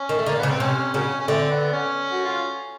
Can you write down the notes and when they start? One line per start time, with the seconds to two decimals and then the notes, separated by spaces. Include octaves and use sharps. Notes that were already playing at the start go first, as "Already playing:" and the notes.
Already playing: C#4
0.09 D#3
0.17 A3
0.26 D3 A#3
0.39 C#3 B3
0.49 C4
0.60 C3 C#4
0.94 C#3 F#3 A#3 C#4
1.20 C#4
1.27 D3 E3 A3 C4
1.51 B3
1.73 C#4
2.12 F#4
2.25 F4